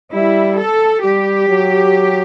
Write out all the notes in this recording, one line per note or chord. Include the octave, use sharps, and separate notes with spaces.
G3 E4
A4
G3 G4
F#3